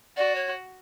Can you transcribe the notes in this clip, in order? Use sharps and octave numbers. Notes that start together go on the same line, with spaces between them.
F#4 D5
C#5